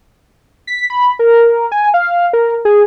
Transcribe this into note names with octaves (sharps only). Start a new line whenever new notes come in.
B6
B5
A#4
G#5
F5
A#4
G#4